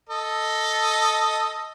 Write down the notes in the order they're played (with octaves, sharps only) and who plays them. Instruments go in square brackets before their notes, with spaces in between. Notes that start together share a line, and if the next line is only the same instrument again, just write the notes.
[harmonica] A4 D#5